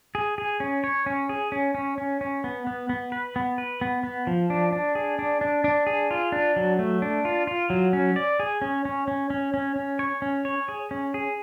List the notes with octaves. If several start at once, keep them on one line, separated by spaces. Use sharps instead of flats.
G#4
G#4
C#4
C#5
C#4
G#4
C#4
C#4
C#4
C#4
B3
B3
B3
B4
B3
B4
B3
B3
F3
D4
D4
G#4
D4
D4
D4
G#4
F4
D4
F#3
A3
D4
F4
F4
F#3
C#4
D5
G#4
C#4
C#4
C#4
C#4
C#4
C#4
C#5
C#4
C#5
G#4
C#4
G#4